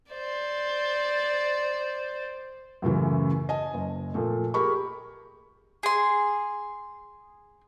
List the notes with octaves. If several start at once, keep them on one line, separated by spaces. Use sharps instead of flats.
C5 D5
F#2 A2 C#3 E3
D#5 G#5 A5
F#1
A#2 F3 A3
G4 G#4 A#4 B5 C#6
G#4 C6